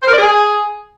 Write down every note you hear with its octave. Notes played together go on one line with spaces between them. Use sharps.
C5
A#4
D5
G#4